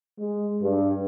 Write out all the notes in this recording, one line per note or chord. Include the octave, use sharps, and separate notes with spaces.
G#3
G2